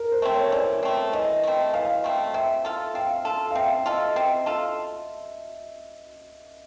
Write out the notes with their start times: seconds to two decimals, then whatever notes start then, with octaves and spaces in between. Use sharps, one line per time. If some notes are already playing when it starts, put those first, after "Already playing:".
Already playing: A#4
0.12 C5
0.22 A3 C4
0.32 C#5
0.52 E3 D5
0.83 A3 C4
1.13 E3 D#5
1.43 A3 C4
1.74 E3 F5
2.04 A3 C4
2.34 C4 E5
2.65 F4 A4
2.94 C4 F5
3.25 F4 A4
3.51 F5
3.55 C4 E5
3.86 F4 A4 D#5
4.16 C4
4.46 F4 A4